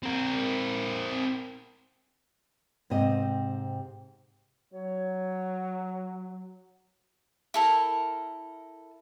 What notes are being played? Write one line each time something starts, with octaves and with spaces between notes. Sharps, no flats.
C4 A#4
G#2 C3 C4 D#5
F#3 C#5
E4 A4 A#4